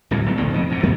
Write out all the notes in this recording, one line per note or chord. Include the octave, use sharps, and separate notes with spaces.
D1 C2 F2 A2
B1 E2
A1 D2 B2 D#3
F#1 F2 C#3
F2 G#2 C3
F2 C3 A3 B3